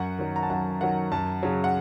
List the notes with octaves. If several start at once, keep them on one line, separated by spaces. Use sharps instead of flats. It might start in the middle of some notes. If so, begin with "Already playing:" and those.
Already playing: F#2 F#5
D#3 F#3
A#5
A5
F#2 F#5
D#3 F#3 F#5
F#2 A5
C#3 F#3
F#5